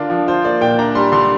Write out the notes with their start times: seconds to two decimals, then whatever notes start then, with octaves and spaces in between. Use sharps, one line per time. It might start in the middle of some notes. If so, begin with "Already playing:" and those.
Already playing: D3 D4 F4 A#4
0.10 F3
0.27 F4 C5
0.44 A#3 D5
0.61 A#2 G5
0.79 D4 A#5
0.95 G3 C6
1.12 D3 C6